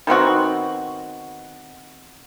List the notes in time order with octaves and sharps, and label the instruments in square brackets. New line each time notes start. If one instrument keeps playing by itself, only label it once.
[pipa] D#3 B3 C4 F#4